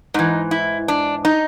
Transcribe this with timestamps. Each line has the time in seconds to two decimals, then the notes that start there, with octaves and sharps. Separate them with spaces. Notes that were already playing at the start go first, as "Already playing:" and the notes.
0.14 G#2 E3 D#4
0.51 E4
0.88 D4
1.25 D#4